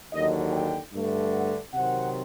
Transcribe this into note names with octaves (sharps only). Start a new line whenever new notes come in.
D#2 D3 F#3 D#5
G5
G2 D3 A3
F#5
C3 D#3 F#3 C4 F#5